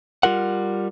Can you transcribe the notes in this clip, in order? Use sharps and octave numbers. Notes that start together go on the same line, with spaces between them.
G3 F4 A#4 F#5